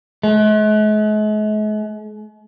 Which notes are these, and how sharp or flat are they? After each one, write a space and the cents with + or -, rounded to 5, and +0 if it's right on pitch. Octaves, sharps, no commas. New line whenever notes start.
G#3 +45